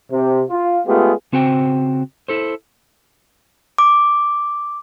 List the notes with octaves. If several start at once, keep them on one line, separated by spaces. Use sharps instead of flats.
C3
F4
G#3 A3 B3 F4 G4 G#4
C#3 C4 F#4 C5 G5
E4 A4 C5
D6